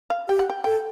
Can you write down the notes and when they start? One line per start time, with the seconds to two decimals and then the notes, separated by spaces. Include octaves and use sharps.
0.10 F5
0.28 G4 G5
0.39 F#5
0.50 G5
0.64 A4 G5